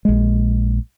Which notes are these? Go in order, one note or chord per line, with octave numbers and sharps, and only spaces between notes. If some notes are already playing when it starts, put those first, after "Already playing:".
A#1 G#3